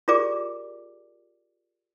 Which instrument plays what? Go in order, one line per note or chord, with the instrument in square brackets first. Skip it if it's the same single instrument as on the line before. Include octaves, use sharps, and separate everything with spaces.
[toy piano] F4 G4 G#4 A#4 D5 D6